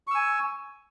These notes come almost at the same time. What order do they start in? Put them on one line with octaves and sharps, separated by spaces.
C#6 E6 G#5